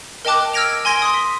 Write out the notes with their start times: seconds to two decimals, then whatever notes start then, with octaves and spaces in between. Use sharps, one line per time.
0.25 A#4 D#5 G5 A5 D6 F#6
0.53 E6 F6 G#6 A#6 D7 F7
0.85 G#5 C6 G#6 A#6 D7 G7
1.02 C6 D#6
1.14 B6